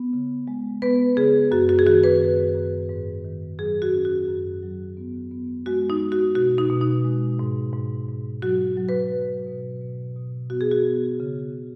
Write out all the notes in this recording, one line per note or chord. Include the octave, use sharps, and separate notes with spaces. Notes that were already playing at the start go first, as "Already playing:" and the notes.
Already playing: B3
C#3
G#3
B3 B4
C#3 G#4
F#2 F#4
F#4
G#4
D#3 F#4
B4
F#2
F#2
G#2
D#3
F#3 G#4
F#4
C#4
F#4
F#2
F#3
B3
B3
G#3 F#4
D#4
G#3
F#4
B2 F#4
D#4
B2
D#4
G#3
G#2
G#2
G#2
F#3 F#4
F#3
B4
F#3
B2
B2
B2
B3 F#4
G#4
F#4
B3
C#3